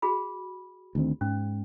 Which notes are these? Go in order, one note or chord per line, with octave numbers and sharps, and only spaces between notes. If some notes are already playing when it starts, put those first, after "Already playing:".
F#4 G#4 B5
D2 D#3 C4
G#2 C#4